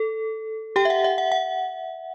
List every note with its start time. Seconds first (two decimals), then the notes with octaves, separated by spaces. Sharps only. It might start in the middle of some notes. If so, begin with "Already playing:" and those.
Already playing: A4
0.76 G4 G5
0.85 E5
0.90 F#5
1.04 E5
1.18 F#5
1.32 F#5